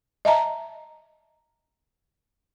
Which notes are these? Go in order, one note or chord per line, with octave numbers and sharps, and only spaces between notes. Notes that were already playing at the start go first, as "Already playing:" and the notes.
D#5 E5 A5 A#5